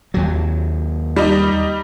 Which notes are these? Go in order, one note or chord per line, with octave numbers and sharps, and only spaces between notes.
D#2 F#3
G3 D#4